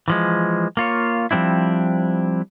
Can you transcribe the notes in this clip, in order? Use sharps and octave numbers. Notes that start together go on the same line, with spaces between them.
E3 F3 G#3
A#3 F4 C#5
F3 G3 C4 D4 E4